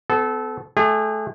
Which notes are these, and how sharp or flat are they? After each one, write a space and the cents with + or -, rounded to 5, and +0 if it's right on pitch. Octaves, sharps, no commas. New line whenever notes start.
B3 +40 A4 -20
A3 -25 G#4 -40